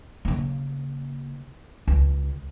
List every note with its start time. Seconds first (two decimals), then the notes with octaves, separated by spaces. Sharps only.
0.25 C#3 A#3
1.88 C#2